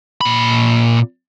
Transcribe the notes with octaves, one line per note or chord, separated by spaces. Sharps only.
A#2 B5